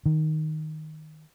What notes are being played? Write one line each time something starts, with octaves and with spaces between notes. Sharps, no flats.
D#3